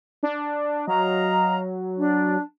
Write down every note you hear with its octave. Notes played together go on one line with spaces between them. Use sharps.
D4
F#3 D#5 F5 A#5
D4